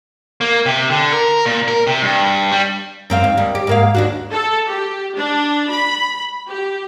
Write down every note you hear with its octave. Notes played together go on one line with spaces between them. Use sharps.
A#3
C3
D3
A#4
A#2
A#4
C3
G2
G3
F#2 C4 F5
D#2
D#2 G3
G4
G#2 A#3 F5
D#2 D4 F#4
A4
G4
D4
B5
G4